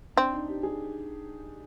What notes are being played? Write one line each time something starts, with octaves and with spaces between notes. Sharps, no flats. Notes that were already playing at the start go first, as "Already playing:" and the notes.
C4 D4
D#4
G4
G#4